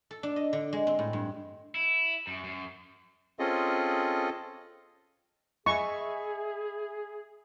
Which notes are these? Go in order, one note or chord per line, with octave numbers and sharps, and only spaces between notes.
A4
D4
D#5
D3
G#3
C4
A2
G2
E4
F#2
F#2
C4 C#4 F4 G#4 A4 D#5
G#4 D#5 E5 G#5 B5 C#6